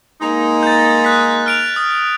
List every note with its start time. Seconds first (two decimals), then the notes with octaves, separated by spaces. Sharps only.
0.21 G#3 A#3 D#4
0.63 G6 A6
1.04 F#6 B6
1.46 F6 D7 F7
1.76 D#6